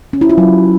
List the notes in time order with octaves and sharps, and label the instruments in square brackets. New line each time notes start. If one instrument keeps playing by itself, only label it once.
[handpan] C#4
E4
F4
F#3